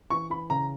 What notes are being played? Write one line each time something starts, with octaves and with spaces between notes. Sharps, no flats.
E3 C#6
E3 B5
C#3 A#5